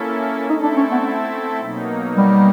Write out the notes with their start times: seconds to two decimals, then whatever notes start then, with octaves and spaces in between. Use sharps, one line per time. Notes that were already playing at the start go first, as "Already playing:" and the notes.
Already playing: A#3 C#4 E4 A4
0.49 A3 C4 D#4 E4 A4
0.63 D4
0.77 C#4
0.91 B3
1.61 B2 F#3 A#3 D#4
2.17 G3